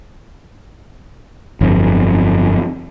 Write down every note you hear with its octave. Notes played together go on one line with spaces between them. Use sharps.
G1 F2